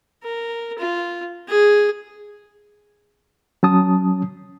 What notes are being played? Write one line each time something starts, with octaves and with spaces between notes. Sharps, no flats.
A#4
F4
G#4
F#3 C#4 A5 D#6